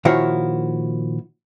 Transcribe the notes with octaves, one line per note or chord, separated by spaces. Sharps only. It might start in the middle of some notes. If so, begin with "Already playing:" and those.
A#2 D#3 F3 E4 F#4 C#5